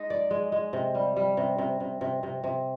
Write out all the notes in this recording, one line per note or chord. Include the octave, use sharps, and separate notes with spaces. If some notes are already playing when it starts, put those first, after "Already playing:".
Already playing: G#3 D#4
D5
G#3
G#3
C3
G3
G3
C3
C3
C3
C3
C3
C3